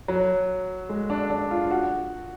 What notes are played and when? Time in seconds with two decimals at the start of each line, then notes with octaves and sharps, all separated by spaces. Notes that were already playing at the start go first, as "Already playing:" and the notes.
0.08 F#3
0.89 G#3
1.10 D4
1.30 D4
1.51 F4
1.71 F#4